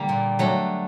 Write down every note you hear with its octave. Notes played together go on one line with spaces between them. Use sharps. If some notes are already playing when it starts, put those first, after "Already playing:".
Already playing: D3 G3 A#3
A#2
F#3 A3 D4